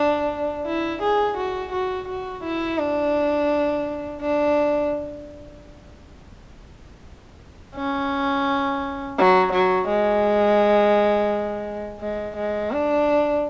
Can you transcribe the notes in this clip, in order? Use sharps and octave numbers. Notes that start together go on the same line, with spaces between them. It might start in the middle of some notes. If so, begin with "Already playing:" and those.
Already playing: D4
E4
G#4
F#4
F#4
F#4
E4
D4
D4
C#4
F#3
F#3
G#3
G#3
G#3
D4